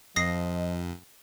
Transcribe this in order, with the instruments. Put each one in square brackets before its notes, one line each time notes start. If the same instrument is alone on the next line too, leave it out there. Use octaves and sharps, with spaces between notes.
[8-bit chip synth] F2 [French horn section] F3 D#5 [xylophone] D#6 A#6 C7